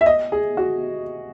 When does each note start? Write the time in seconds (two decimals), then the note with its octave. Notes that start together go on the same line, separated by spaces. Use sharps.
0.01 E5
0.06 D#5
0.32 G#4
0.57 F#4